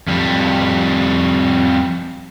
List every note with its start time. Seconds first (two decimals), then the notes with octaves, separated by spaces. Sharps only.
0.08 F2 G3